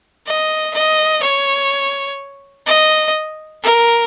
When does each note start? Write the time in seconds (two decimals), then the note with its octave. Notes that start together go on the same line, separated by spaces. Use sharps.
0.27 D#5
0.75 D#5
1.23 C#5
2.67 D#5
3.64 A#4